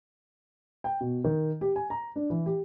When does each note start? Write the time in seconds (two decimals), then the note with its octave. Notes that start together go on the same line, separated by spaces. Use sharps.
0.84 G5
1.01 B2
1.24 D#3
1.61 G4
1.76 G#5
1.90 A#5
2.16 D4
2.30 E3
2.46 G4